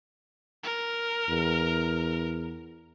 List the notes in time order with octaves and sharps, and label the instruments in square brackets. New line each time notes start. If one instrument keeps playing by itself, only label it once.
[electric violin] A#4
[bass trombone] E2